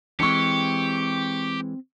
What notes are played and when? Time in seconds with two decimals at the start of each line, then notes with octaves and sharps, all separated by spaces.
0.20 E3 G#3 C4 D4 G4 C#6 C#7